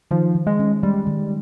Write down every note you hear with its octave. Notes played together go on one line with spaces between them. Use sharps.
D#3 F3
D#3
G#3
C#4
G3 G#3
D#3